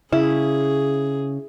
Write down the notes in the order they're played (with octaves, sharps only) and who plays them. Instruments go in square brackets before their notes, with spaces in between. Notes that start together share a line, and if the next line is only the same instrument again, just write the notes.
[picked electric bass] C#3 [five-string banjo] E4 [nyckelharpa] G#4